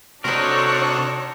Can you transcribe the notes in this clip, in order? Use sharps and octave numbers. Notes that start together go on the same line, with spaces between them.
C3 D4 D#4 F#4 A4 A#4 C#5 C#6